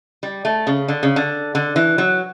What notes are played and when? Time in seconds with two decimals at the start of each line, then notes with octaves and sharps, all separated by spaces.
0.23 G3
0.45 A3
0.67 C#3
0.88 D3
1.03 C#3
1.16 D3
1.55 D3
1.76 E3
1.98 F#3